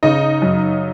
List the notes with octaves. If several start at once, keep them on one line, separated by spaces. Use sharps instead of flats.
C#3 D#4 D#5
F#2